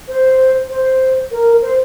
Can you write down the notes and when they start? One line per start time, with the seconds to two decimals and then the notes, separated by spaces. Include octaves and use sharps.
0.08 C5
0.70 C5
1.31 A#4
1.62 C5